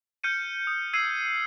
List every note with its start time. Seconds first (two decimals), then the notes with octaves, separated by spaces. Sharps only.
0.24 F6 G6 C#7 D#7
0.67 D#6
0.93 E6 G#6 C7 D#7